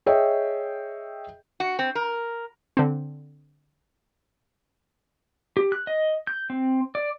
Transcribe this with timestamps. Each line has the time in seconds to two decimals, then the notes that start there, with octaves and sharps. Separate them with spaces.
0.06 G#4 C#5 D#5 E5 G5
1.60 F#4
1.79 C4
1.95 A#4
2.77 D3 C4
5.57 G4
5.72 F#6
5.87 D#5
6.27 G6
6.50 C4
6.95 D5